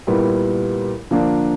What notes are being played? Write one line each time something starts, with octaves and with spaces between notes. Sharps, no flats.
A#2 G3 B3 E4
D3 F3 A#3 D4